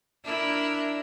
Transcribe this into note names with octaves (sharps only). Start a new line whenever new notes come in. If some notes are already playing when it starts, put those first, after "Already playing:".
D4 E4 A#4